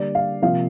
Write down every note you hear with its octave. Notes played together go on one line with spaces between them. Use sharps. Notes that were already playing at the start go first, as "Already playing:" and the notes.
Already playing: D3 G3 A#3 D5
F5
C3 F3 A#3 F5